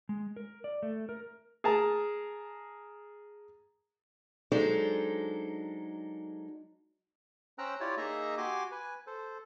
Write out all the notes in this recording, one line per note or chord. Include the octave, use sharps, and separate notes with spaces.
G#3
A#4
D5
A3
A#4
G#4 A#4 A5 A#5
F#3 G#3 D4 D#4 A4 C5
C#4 C5 G5 A#5 E6 F#6
E4 F4 G4 C#5 D5
A#3 D#4 G#4 D#5 E5 A#5
F#4 G4 G#5 C6 D6
B4 G#5
A4 C5